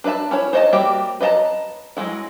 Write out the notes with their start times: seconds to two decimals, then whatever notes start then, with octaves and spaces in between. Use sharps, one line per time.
0.04 D4 B4 D5 E5 A5
0.31 C#4 E4 C#5
0.53 C5 C#5 D#5 F#5 A5
0.73 G3 A#3 F#4 G4 E5
1.21 B4 D#5 F5 A5 A#5
1.97 F#3 G#3 E4